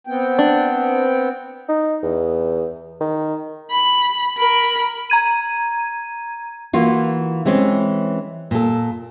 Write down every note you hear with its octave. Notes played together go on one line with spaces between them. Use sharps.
B3 C4 G5
D4
D#4
E2
D#3
B5
A#4 B5
A#5 G#6 D#7
E3 A#3 F4 F#4
E3 G#3 C4 C#4
A#2 A4